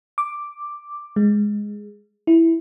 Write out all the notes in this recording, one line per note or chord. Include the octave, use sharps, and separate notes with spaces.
D6
G#3
E4